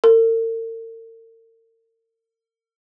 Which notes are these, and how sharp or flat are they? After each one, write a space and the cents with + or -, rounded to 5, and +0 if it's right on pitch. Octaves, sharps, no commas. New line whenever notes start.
A#4 -45